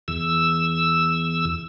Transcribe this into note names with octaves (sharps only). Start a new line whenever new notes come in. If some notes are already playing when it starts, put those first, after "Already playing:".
E2 E6